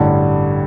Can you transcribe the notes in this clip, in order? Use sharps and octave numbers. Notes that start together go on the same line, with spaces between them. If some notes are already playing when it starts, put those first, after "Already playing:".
Already playing: A1 G2 D3 G3